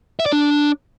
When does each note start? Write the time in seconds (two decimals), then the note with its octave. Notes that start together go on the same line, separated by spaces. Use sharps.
0.20 E5
0.26 D5
0.32 D4